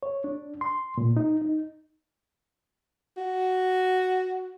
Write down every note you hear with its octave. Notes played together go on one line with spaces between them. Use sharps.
C#5
D4
C6
A#2
D#4
D#4
F#4